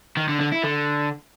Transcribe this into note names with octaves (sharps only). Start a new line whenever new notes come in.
D#3
D3
D3
E4
D3